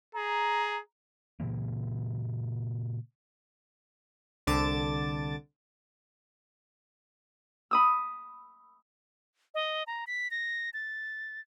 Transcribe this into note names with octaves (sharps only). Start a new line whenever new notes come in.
G#4 A#5
A#2 C#3 E3 A#3
C2 D3 A5 D6 A6
B5 D#6 E6
D#5
A#5
B6
A#6
A6